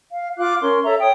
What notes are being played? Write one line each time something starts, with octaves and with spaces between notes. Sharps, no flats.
F5
F4 F5 D6 F#6
C#4 A#4 C6
A4 C#5 E5 A#5
C#5 G5 D#6